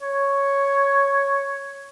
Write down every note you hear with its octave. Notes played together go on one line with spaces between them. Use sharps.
C#5